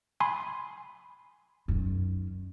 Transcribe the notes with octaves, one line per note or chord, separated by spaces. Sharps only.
G#5 B5 C6
F#2 D#3